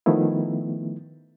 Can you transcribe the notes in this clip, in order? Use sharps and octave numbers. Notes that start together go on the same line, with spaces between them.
D#3 F3 A3 B3 E4